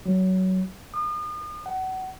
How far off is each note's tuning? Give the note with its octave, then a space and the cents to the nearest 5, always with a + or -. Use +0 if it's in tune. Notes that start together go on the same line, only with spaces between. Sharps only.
F#3 +15
D#6 -40
F#5 +25